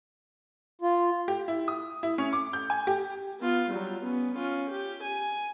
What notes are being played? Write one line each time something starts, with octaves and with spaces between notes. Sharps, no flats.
F4
G4
E4
D#6
E4
C#4
D6
G6
G#5
G4
B3 F4
F#3 G3
B3 C#4
C#4 F4
G4
G#5